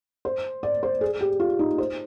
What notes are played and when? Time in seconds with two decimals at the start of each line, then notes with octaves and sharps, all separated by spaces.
0.25 C5
0.63 D5
0.83 C5
1.01 G#4
1.21 G4
1.40 F4
1.59 D#4
1.78 C5